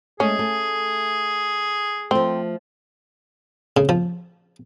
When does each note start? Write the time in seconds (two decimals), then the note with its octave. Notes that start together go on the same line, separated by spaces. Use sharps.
0.20 G#3 A3 C#4 G#4
0.39 A3
2.11 F3 A3 C4
3.77 C#3
3.89 F3